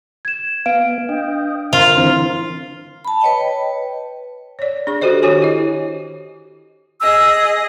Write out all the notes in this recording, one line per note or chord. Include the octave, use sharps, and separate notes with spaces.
G#6 E7
B3 F5 D7
D4 D#5 G5
F4 A#4 C5
D3 E3 C4 F6
A5 B5
B4 C#5 D#5 G5
C#5 D5
D4 G#4 C#6
D4 F#4 G4 A4 C5 D#5
D#3 F#4 G4 C#5 G#5
E4 D#5
G#4 D#5 E6